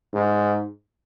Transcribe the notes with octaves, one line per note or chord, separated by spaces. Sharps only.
G#2